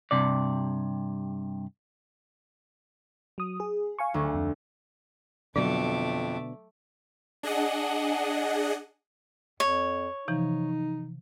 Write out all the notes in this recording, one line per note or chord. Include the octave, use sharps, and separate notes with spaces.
G2 C3 D5
F#3 D#6
G#4
F5 G#5 C#6
D2
F2
F2 B2 D3 F#3 A3 D5 D#5 D6
D4 G#4 D#5 F#5
F2 C#5
C3 E3 F3 D#4